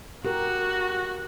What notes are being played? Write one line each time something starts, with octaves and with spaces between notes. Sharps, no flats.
F#4 G4 A#4